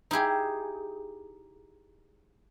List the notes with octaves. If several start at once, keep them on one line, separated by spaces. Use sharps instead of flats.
D#4 E4 G4 G#4